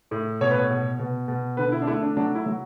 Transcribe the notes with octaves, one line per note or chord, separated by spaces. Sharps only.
A2
B2 C#5
B4
C#5
B2
B2
B2
D3 B4
E4
D4
A3 E4
D4
F#3 D4
E4
F#3